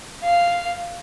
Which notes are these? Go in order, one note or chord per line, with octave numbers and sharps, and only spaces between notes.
F5